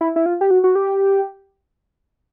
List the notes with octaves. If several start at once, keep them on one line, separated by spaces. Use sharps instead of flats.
E4
E4
F4
G4
F#4
F#4
G4